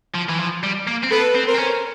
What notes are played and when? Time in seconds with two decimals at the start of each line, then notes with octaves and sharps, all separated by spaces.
0.15 F3
0.29 E3
0.40 F3
0.64 G3
0.87 A#3
1.03 C4
1.11 B3 A4 B4
1.35 C4
1.47 A#4 C5
1.55 C4
1.59 C#4